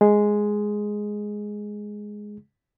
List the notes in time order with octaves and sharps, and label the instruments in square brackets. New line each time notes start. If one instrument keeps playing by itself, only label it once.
[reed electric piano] G#3 G#4